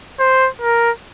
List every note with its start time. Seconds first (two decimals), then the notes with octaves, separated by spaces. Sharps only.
0.20 C5
0.62 A#4